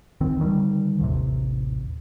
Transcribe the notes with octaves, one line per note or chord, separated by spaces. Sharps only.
D1 D2 D#3 C4
D3 D#3 G3
A1 D#2 C3